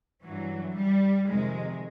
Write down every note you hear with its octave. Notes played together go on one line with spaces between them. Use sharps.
G2 E3 F#3
G3
F2 C3 D#3 G#3